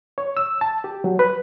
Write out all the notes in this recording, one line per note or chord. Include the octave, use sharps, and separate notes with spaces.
C#5
E6
A5
G4
F#3
B4